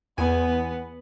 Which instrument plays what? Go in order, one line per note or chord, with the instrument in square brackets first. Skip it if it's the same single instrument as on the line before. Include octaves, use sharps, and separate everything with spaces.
[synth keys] E2 G#5 [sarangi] B3